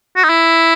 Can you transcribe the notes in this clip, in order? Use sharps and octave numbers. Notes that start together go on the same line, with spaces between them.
F#4
D#4
E4